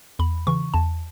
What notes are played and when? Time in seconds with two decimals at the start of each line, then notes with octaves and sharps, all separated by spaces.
0.19 E2 B5
0.47 C#3 E3 C#6
0.74 E2 A5